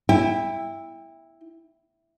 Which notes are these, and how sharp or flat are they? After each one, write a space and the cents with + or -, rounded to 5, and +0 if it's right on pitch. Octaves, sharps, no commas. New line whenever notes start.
E4 +0 G5 +30